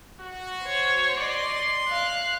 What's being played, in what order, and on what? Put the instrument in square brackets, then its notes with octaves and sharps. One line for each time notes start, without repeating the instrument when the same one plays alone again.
[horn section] F#4
[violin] C5 C#5
[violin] D5 D#5 [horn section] C6
[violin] F5 F#6